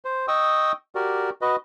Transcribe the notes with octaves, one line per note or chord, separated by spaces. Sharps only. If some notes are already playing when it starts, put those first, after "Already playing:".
C5
D#5 G5 C#6 D#6 E6
F#4 G4 A#4 D5
F#4 B4 D#5